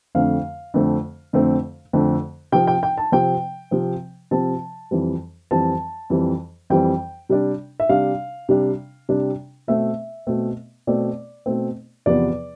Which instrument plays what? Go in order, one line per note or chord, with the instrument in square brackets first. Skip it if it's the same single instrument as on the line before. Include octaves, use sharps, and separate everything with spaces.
[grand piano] F2 D3 A3 C4 F5
F2 D3 A3 C4
F2 D3 A3 C4
F2 D3 A3 C4
C3 F3 C4 G5
G5
G5
A5
C3 F3 C4 G5
C3 F3 C4
C3 F3 C4 A5
F2 E3 G3 C4
F2 E3 G3 C4 A5
F2 E3 G3 C4
F2 E3 G3 C4 G5
C3 G3 D4
E5
C3 G3 D4 F5
C3 G3 D4
C3 G3 D4
B2 A3 C4 E5
B2 A3 C4
B2 A3 C4 D5
B2 A3 C4
E2 C3 F3 B3 D5